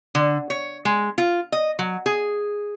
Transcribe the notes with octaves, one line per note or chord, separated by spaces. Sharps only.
D3
C#5
G#3
F4
D#5
F#3
G#4